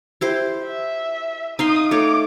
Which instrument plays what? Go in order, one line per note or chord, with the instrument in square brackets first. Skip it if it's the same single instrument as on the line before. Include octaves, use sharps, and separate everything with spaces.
[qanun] E4 G4 C5
[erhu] E5
[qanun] D#4 F5 C6 [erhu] D#6
[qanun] A3 D#4 C#5 [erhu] D6